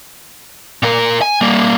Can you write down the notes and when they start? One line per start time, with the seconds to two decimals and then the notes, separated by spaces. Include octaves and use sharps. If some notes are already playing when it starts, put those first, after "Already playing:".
0.83 A#2 A#4
1.22 G#5
1.41 G3 A#3